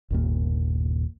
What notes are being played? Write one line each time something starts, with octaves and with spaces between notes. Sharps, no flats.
G1 D#2 A#2